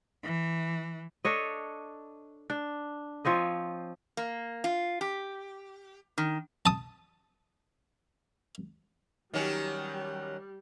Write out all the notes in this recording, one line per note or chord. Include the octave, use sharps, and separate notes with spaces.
E3
D4 A4 C#5 D#5
D4
F3 C4 C#5 D#5
A#3
F4
G4
D#3
A5 D#6
D#3 F#3 G3 C#4 G4